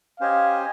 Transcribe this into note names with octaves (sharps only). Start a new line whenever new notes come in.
C#4 G4 C5 D#5 F5 G#5